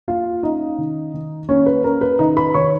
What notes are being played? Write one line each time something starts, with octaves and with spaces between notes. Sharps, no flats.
A#3 F4 F5
C#4 D#4 D#5
D#3
D#3
A#3 C#4 C#5
B4
C#4 A#4
B4
D#3 D#4 D#5
B4 B5
D#3 C#5 C#6